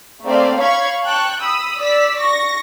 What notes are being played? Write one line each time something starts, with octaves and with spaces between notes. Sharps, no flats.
A3 A#3 C4 D5 F5
C#5 F5 B5 C#6 G#6
G5 A5 C#6 F#6
B5 D#6 E6
D5 E6 B6
C#6 A#6